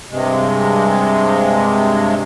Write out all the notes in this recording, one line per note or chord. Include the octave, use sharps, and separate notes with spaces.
G2 C3 G#3